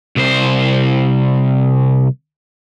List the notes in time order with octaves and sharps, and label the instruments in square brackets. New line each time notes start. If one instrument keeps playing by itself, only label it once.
[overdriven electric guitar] C2 C5